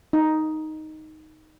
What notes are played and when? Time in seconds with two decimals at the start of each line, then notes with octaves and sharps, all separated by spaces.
0.13 D#4